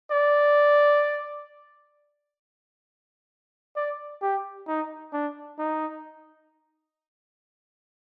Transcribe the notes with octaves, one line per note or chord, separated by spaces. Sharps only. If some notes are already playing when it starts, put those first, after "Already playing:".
D5
D5
G4
D#4
D4
D#4